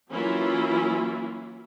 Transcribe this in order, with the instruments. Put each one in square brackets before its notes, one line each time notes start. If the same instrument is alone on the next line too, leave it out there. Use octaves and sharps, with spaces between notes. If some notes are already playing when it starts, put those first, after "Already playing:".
[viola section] E3 F#3 A#3 C#4 E4 F4